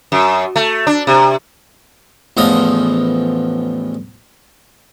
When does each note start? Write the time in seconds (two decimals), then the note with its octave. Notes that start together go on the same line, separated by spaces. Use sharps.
0.12 F#2
0.56 A3
0.87 D4
1.07 C3
2.37 A1 E2 F3 D#5 D#6